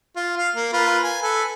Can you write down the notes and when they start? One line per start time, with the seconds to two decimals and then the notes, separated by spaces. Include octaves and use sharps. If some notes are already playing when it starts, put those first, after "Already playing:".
0.16 F4
0.38 F5
0.56 A#3
0.73 F4 A#4 B4
1.03 G#5
1.22 A4 B4 G#5